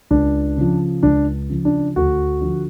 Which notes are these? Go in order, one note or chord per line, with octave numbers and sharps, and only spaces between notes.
C#2 D4
C#3 F3
C#2 D4
C#3 F3
D4
D2 F#4
D3 F3